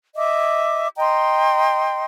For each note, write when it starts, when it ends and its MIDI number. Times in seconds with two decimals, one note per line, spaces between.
0.16 0.87 75
0.16 0.87 76
0.16 0.87 86
0.97 2.05 75
0.97 2.05 79
0.97 2.05 82
0.97 2.05 84